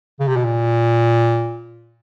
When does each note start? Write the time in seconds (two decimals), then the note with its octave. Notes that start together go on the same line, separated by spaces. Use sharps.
0.20 C#3
0.28 C3
0.37 B2
0.45 A#2